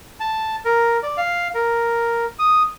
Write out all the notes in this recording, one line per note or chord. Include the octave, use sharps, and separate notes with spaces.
A5
A#4
D5
F5
A#4
D#6